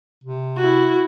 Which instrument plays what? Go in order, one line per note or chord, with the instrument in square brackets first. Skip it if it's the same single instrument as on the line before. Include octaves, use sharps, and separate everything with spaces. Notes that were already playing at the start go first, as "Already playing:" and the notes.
[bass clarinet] C3
[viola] E4 F#4